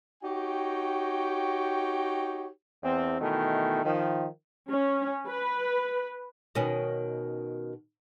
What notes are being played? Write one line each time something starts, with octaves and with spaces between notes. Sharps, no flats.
D#4 F#4 G4 C#5 G5
E2 C4
B2 D#3 E3 A3
D#3 F3
C#4
B4
B2 D#3 C#4